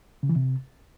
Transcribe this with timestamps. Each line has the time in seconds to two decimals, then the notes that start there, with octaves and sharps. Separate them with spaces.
0.23 C#3
0.29 E3
0.36 C3